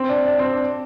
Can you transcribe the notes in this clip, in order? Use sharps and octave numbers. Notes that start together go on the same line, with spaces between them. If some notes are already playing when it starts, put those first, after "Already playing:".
Already playing: C4
D4
D4
C4
D4